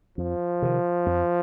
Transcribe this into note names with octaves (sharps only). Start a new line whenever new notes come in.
F2 F3
C3 D#3
F2